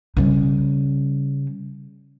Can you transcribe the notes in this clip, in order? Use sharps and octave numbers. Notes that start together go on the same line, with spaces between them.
C#3 G3